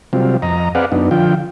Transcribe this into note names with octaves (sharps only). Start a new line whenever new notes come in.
C3 F#3 G3 C4 F4
F2 D#5 A#5
C4 G#4 B4 D5 F5 F#5
F#2 B3 D4 D#4
D3 F3 F4 G5